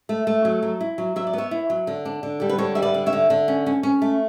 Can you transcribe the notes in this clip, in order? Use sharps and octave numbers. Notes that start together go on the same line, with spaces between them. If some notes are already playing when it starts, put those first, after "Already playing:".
A3
A3
F#3
F#3
E4
F#3
F#3 E5
D5
B3 C#5 E5
E4
F#3
D3
D4
D3
G3 A4
B4
D3 A4 C#5
G3 E5
B4 D5
D3
C#5 E5
D3
D3
C#4
C#4
C#4
A3